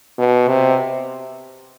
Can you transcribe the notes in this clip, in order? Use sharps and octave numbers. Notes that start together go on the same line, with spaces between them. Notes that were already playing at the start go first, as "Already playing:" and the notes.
B2
C3